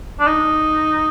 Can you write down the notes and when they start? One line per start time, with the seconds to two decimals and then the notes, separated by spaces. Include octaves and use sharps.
0.20 D4
0.27 D#4